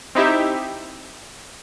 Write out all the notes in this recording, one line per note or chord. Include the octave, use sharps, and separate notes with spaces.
C4 D#4 E4 G4 E5